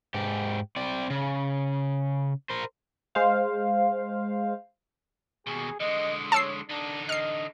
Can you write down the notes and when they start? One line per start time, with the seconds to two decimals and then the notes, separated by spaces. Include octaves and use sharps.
0.14 G#2 G4
0.76 C4 D5
1.10 C#3
2.50 A#4 C5
3.15 G#3 C5 F5
5.47 D#2 B2 G#4
5.80 D3 G#3 D#5
6.32 C#5 A5 E6 C7
6.69 D3 D4 D#4
7.09 D#5 F6 C7